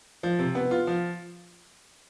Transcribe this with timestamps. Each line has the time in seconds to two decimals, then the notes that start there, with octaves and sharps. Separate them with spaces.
0.23 F3
0.39 C3
0.55 B3
0.71 F4
0.87 F3